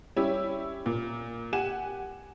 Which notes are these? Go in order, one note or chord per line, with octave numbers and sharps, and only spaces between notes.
G3 C#4 E4 G4
A#2
G4 F#5 G#5 E7